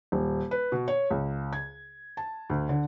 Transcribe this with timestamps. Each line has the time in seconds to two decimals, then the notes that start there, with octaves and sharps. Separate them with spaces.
0.12 D#1
0.51 B4
0.72 B2
0.88 C#5
1.11 C#2
1.53 G#6
2.17 A5
2.50 D2
2.69 D3